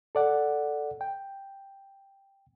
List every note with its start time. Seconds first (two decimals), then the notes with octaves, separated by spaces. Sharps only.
0.15 A4 D5 F#5
1.01 G5